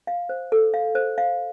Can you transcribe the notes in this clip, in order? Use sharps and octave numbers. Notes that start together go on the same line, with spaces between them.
F5
C5
A4
F5
C5
F5